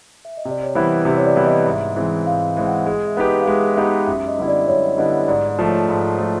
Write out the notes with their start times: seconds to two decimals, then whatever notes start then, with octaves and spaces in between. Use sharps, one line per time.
0.25 E5
0.37 D#5
0.45 C3 D5
0.63 C#5
0.75 E3 G3 B3 E4 C5
1.05 C3
1.17 C#5
1.25 D5
1.36 E3 G3 B3 E4
1.46 D#5
1.66 G#2 E5
1.96 E3 G#3 C4
2.26 G#2 F5
2.57 E3 G#3 C4
2.67 F#5
2.86 G#3
3.07 E5
3.17 B3 D#4 G4 B4
3.27 D#5
3.41 F5
3.47 G#3 E5
3.77 B3 D#4 G4 B4
4.07 F#2 E5
4.28 D#5
4.38 D3 G3 B3 E4
4.48 D5
4.67 F#2 C#5
4.97 D3 G3 B3 E4 D#5
5.28 G#2 D5
5.48 D5
5.59 F3 A3 C5
5.68 C#5
5.89 G#2
6.19 F3 A3